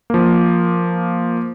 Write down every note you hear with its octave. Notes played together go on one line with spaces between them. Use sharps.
F3 A#3